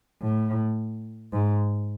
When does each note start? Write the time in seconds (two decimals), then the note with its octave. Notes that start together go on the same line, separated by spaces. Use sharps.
0.22 A2
1.33 G#2